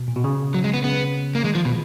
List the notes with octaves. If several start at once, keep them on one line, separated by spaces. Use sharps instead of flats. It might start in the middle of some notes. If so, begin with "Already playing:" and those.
Already playing: B2
A#2
B2
C#3
F#3
G#3
B3
C#3 B3
A#3
D#3 G#3
F3
B2